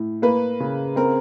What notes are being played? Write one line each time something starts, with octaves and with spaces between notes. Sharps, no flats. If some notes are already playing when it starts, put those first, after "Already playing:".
Already playing: A2
A#3 B4
C#3
C4 A#4